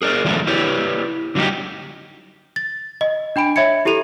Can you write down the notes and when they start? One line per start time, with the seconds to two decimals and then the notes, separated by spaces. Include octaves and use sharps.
0.02 G#4 A#4 D5
0.25 D#3 F3 G#3 A3 D4 E5
0.47 E4 G4 B4 C#5 D5
1.35 D3 F#3 G3 D#4 G4
2.56 A6
3.01 D#5
3.36 D4 G5 B5 D7
3.56 C#5 E5 B5 G#6 C#7
3.85 E4 G4 A4 D#7 F7